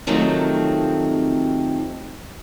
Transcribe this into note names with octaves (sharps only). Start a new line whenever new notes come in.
C3 D#3 F3 F#3 A3 C4